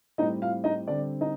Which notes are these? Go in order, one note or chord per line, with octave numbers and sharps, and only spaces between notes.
A2 G3 C4 D#4 D#5
F4 F5
D#4 D#5
D3 G3 C4 D4 D5
D#4 D#5